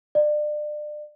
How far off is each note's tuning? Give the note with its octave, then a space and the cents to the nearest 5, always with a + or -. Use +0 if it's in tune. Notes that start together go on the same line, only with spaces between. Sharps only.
D5 +30